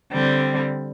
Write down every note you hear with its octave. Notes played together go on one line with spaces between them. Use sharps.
D3 G3 C4